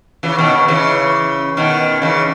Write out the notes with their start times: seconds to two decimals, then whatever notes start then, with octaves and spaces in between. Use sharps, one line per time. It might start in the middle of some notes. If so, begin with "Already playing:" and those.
0.23 C#3 E3
0.38 B2 D#3
0.53 C#3
0.68 C#3 E3
1.57 B2 D#3
2.02 C#3 E3